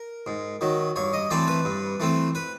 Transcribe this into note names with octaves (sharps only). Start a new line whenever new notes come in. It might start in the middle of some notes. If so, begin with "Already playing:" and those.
Already playing: A#4
G#2
D#3 F#3
G2 C#5
D#5
E3 A3 C4 D5
B4
G2
E3 A3 C4
B4